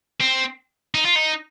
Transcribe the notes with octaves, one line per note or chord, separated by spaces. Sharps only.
C4
D#4
F4
D#4